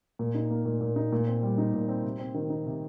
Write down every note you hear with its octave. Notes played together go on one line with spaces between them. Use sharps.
A#2
D#4
A#3
A#2
A#2
D#4
A#2
C4
G3
D#4
A#2
C4
C3
C4
D#3
D#4
C3